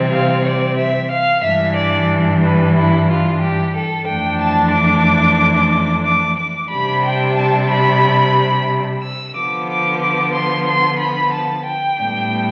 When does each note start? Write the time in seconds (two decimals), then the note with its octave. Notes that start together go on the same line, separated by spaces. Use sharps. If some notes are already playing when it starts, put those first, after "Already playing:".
Already playing: C3 E3 G3 C4
0.12 F5
0.46 D5
0.78 E5
1.11 F5
1.43 G2 E3 G3 D4 E5
1.76 D5
2.43 B4
2.76 E4
3.10 F4
3.42 G4
3.75 A4
4.07 F2 E3 A3 D4 G5
4.41 A5
4.73 D6
6.06 D6
6.40 D6
6.71 C3 G3 D4 B5
7.05 G5
7.38 A5
7.70 B5
9.03 E6
9.36 D3 F3 B3 D6
9.70 D6
10.02 D6
10.36 C6
10.68 C6
11.01 B5
11.35 A5
11.67 G5
12.00 A2 G3 B3 D4